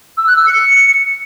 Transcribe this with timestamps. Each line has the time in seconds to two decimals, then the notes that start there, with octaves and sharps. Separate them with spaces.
0.17 E6
0.27 F#6
0.37 E6
0.47 C#7